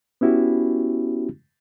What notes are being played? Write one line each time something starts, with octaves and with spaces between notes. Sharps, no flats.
B3 C#4 E4 F#4 G4